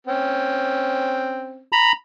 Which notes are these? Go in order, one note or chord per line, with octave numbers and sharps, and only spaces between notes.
C4 C#4
A#5 B5